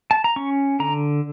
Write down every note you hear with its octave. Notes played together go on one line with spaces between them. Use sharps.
A5
A#5
C#4 C#6
D3 A#5